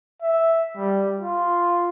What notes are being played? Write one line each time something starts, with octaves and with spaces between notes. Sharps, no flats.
E5
G3
F4